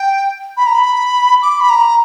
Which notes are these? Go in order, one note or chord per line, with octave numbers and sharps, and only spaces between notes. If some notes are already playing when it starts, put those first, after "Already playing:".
Already playing: G5
B5
A#5
B5
D6
B5
A#5